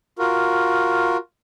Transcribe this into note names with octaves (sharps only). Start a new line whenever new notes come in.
F4 F#4 A#4